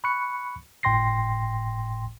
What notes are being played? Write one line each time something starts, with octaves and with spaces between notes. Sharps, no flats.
B5 C#6 F#6 C#7
G1 A2 G5 C6 A#6 C7